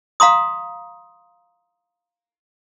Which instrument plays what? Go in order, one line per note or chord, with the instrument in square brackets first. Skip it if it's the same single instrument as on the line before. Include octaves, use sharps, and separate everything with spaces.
[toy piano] F5 A#5 C6 D#6